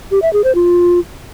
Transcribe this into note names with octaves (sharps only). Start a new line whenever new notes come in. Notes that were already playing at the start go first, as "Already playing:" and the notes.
G4
E5
G#4
C5
F4